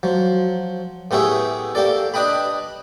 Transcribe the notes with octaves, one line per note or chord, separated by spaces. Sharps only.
F3 F#3
A2 B3 G4 G#4 C#5 E5
A#3 G4 A4 D5
D4 B4 D#5 G5 B5